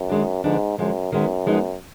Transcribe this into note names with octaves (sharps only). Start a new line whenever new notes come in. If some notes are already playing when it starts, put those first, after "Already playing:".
Already playing: F#2
D#3 G#3 D4
G#2 D3 F3 B3 D4
F#2 D3 F3 G#3
F#2 D#3 G#3 B3
F3 G#3 B3 D#4